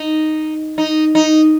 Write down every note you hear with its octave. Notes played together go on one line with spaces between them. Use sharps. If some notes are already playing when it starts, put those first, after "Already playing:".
Already playing: D#4
D#4
D#4